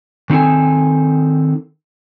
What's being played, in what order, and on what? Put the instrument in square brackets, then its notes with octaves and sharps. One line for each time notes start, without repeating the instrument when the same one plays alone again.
[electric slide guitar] D#3 C4 D#4 A4 G#5